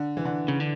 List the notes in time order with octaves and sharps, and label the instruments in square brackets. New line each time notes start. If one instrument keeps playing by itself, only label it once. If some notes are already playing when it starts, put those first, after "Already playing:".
Already playing: [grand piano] D3
E3
D3
[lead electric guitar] C#3
D3